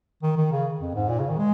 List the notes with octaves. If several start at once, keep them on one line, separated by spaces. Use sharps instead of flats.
D#3
D#3
C#3
F2
G#2
A#2
C#3
D#3
G#3